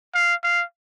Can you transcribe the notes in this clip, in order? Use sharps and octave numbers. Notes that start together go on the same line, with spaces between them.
F5
F5